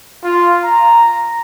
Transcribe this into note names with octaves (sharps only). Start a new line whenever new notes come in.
F4
A#5